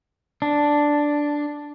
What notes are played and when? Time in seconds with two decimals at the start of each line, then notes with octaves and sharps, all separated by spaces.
0.42 D4